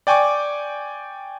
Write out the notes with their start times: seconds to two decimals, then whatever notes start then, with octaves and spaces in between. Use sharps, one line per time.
0.07 D5 G5 G#5 C#6 D6